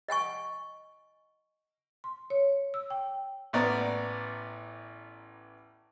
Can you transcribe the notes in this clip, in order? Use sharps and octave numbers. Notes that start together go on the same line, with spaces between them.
D#5 F#5 G#5 C#6
C6
C#5
E6
G5
A1 B3 D5 A#5